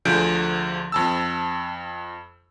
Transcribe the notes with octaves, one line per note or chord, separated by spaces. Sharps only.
D2 D3 F3 G#4 G6 D7
F2 A5 E6